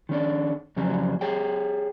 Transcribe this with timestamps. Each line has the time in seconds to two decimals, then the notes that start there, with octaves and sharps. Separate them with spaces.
0.09 D#3 C#4 D4
0.77 F2 C#3 F#3 G3 C#4
1.21 G4 G#4 C#5 G5